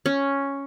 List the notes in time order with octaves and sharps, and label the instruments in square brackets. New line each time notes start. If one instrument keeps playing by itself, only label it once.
[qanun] C#4